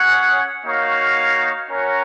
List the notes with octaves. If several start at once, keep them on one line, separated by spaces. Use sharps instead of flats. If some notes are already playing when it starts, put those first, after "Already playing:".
Already playing: C#4 G#4 C#5 F#5
A#3 D#4 F#4 C#5 F5
C#4 F#4 A#4 C#5